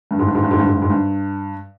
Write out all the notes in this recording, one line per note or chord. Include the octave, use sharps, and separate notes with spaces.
G2
G#2
G2
G#2
G2
G#2
G2
G#2
G2
G#2
G2